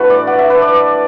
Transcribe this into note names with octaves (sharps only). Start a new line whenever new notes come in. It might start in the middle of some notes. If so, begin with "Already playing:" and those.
Already playing: A2 E3 D4 F#4 A4 B4
D5
F#5
E5
B4
D5